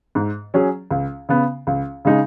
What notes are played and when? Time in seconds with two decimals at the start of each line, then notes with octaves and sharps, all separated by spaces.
0.15 G#2
0.54 F#3 C#4 G#4
0.91 C#2
1.29 C#3 B3
1.67 C#2
2.05 C#3 G#3 D#4 G#4